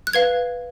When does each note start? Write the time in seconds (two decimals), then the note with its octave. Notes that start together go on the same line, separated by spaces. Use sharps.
0.07 F#6
0.13 B4 F5 G#6